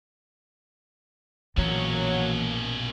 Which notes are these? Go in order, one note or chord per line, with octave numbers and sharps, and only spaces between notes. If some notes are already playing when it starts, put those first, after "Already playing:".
A#1 B2 E3 F#3 A#3 C#4